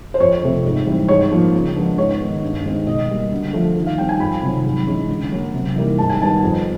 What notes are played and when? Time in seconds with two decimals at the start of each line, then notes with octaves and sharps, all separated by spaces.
0.14 C5
0.20 F2 C#5
0.43 C3 F3 A3 C4
0.65 G#2
0.86 E3 G3 C4
1.08 G#2 C#5
1.32 F3 A#3
1.54 C#3
1.76 F3 G#3 B3 D4
1.97 G#2 C#5
2.20 D#3 G#3 B3
2.43 G2
2.65 D#3 G#3 C4
2.86 B2 D#5
3.09 G3 A#3
3.32 D3
3.53 F3 A3
3.76 D#3
3.86 F5
3.98 G3 C4 D#4 G5
4.09 G#5
4.20 F2 B5
4.42 C3 D#3 F#3
4.64 G#2
4.87 E3 G#3 C#4
5.08 D3
5.31 F#3 A#3 C#4
5.54 C3
5.75 E3 G3 A#3 D#4
5.98 G#2 A5
6.09 G#5
6.20 D#3 G3 B3 A5
6.43 F2